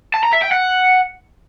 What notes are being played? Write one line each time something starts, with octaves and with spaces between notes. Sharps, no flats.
A5
A#5
E5
G5
F#5